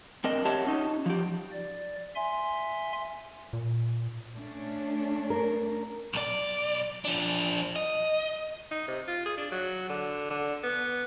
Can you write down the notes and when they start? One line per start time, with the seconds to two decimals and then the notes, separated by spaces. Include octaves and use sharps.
0.24 C4 D4 A#4 D#5
0.45 G4 C#5 E5 F#5 A5
0.67 C#4 D#4
1.06 F3 G4
1.52 D5
2.16 E5 G#5 C6
3.53 A#2
4.34 A3 C#4 D4
5.30 A#4
6.14 B1 D5
7.05 F3 D4
7.76 D#5
8.71 D#4
8.88 C3
9.08 F4
9.26 G#4
9.38 D4
9.52 F#3
9.89 D3
10.30 D3
10.64 B3